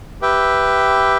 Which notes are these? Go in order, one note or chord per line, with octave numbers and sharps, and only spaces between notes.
G4 B4 E5 G5